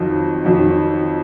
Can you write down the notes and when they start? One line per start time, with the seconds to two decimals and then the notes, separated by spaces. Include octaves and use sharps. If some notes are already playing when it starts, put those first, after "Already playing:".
Already playing: F2 D#3 F#3
0.44 F2 D#3 F#3